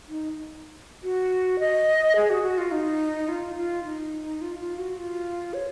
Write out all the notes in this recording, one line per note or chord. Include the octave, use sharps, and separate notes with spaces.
D#4
F#4
D#5
G#4
F#4
F#4
F4
D#4
F4
F4
D#4
F4
F4
F#4
F4
C#5